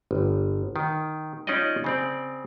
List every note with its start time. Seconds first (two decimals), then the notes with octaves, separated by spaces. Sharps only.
0.11 G1
0.76 D#3
1.47 C#4 D#4 F4 D5 D#5
1.84 C#3 C4 D5